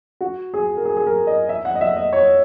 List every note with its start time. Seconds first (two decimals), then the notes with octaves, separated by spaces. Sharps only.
0.21 F#4
0.54 G#4
0.77 A#4
0.85 G#4
0.97 G#4
1.07 A#4
1.27 D#5
1.49 E5
1.65 F#5
1.75 D#5
1.81 E5
1.96 D#5
2.13 C#5